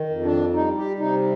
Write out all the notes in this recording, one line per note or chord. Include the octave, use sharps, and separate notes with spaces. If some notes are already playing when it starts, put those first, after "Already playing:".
Already playing: D#3
F2
D4
G3 D#4
G4
C3 D#4